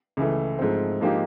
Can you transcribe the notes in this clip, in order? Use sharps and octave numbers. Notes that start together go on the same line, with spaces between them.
C#2 C#3 E3 A3
G#2 F3 A3 C4
G#2 F3 A#3 D#4 G4